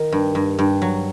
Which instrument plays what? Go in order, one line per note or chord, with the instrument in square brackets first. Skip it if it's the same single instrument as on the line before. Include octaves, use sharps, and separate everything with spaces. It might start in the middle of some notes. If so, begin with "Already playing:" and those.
Already playing: [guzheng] D#3
G2
G2
G2
F#3